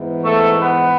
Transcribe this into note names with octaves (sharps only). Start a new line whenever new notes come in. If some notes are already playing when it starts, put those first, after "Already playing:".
Already playing: G#2 E3 B3
A3 A4
B3 B4